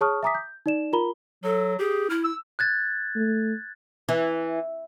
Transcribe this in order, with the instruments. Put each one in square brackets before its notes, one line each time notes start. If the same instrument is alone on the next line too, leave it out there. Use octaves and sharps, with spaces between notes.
[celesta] G#4 C#5 A5 C#6 D#6 F6
E5 G#5 A#5 D6 D#6 B6
G6
D#4 D5 E7
F4 A#4 A#5 B5 G7
[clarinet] F#3 [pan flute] A4
[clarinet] G4 [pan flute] G#4
[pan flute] E4 [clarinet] F6
[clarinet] E6
[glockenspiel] F#6 G#6 A6
[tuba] A3
[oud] E3